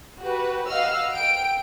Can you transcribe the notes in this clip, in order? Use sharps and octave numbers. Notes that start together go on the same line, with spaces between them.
F#4 G4 B4
D#5 F5 F#5 E6 F6
G5 D7